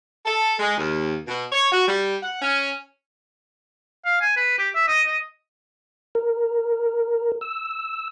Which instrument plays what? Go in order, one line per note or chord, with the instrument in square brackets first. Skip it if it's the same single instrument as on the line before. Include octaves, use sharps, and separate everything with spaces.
[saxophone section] A4
G#3
D#2
B2
C#5
F#4
G3
F#5
C#4
[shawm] F5
G#5
B4
G4
E5
D#5
D#5
[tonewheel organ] A#4
E6